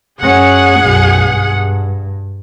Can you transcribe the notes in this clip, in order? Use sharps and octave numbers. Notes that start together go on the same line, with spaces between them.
F#2 C#4 G#4 F#5
B1 F#2
G2